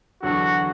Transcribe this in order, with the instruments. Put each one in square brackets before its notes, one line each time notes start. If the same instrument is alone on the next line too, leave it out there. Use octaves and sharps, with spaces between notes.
[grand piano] E2 D3 F#3 D4 A4 [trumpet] F#4